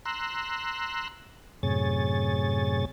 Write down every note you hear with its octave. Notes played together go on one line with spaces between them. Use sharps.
A#5 C6 E6 F#6
F#2 A2 C3 G#4 C#5 A6